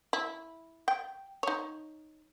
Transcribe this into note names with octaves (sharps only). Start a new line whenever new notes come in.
E4
G5
D#4 C#5